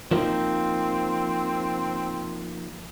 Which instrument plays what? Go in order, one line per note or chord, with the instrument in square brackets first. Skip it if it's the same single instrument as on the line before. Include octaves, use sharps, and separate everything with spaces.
[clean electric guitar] F3 A#3 D#4 [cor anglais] C4